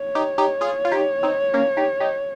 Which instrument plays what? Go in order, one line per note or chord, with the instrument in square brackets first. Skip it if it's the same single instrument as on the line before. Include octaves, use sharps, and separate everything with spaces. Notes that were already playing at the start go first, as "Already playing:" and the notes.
Already playing: [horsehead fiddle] C#5
[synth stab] D#4 G4
D#4 G4
F4 G#4
F4
D#4 G4
C4 D#4
A#3 C#4
D#4 G4
D#4 G4